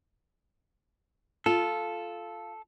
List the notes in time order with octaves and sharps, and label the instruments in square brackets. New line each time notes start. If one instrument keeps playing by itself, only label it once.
[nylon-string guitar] F4 [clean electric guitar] A4